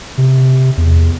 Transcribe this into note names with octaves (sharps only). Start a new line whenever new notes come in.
C3
E2